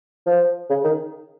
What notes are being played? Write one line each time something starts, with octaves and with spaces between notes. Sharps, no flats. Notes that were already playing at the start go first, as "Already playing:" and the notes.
F3
C#3
D#3